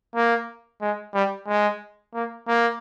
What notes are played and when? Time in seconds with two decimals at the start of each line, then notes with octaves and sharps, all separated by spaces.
0.15 A#3
0.82 G#3
1.14 G3
1.48 G#3
2.14 A#3
2.48 A#3